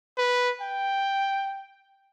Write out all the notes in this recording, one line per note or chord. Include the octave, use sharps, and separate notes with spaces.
B4
G5